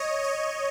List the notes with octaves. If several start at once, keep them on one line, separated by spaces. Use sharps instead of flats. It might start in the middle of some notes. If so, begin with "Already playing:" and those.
Already playing: C#5 D#5
C#5 D#5